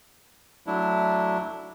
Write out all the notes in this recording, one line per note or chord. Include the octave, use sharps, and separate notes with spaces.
F#3 A3 D4 E4